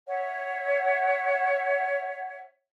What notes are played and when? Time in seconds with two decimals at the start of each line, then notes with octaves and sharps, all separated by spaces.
0.07 C#5 E5 F#5